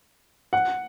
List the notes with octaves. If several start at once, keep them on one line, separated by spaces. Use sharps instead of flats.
F#5